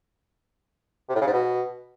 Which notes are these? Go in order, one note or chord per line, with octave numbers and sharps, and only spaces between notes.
C3
A2
C#3
G#2
B2